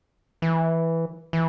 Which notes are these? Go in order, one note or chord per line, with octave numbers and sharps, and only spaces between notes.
E3
E3